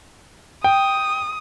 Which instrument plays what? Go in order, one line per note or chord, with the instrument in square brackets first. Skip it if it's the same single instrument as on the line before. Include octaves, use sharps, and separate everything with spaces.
[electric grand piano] G5 [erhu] D#6